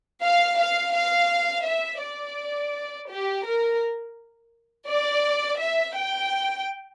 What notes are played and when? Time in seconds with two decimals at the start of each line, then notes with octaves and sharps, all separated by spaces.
0.23 F5
0.59 F5
0.95 F5
1.66 E5
2.03 D5
3.10 G4
3.46 A#4
4.89 D5
5.61 E5
5.97 G5